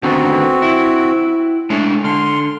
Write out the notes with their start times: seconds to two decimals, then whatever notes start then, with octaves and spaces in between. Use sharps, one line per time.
0.03 D3 D#3 B3 C4 F#4
0.62 E4
1.70 G#3 A3 D4 C#5
2.04 D3 C6 F6